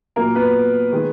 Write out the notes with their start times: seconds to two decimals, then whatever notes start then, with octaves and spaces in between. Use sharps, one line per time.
0.16 A#2 F#3 A#3 A#4
0.35 B3 B4
0.92 D#3 G#3